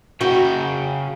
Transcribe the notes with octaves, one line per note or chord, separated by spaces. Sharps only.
C#3 F#4 G5